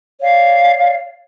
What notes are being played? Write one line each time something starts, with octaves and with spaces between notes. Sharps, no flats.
C#5 D5 F5